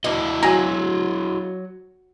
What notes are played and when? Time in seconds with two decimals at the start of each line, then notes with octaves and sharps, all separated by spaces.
0.04 D2 E4 F#4 D#5
0.43 F#3 G#5 A#5